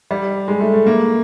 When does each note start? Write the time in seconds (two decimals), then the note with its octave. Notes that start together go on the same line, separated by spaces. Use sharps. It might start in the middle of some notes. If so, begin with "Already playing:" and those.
0.11 G3
0.48 G#3
0.60 A3
0.73 A3
0.86 A#3